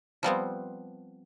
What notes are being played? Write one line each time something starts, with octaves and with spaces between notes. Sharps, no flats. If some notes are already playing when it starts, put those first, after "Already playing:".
F3 G3 B3 C4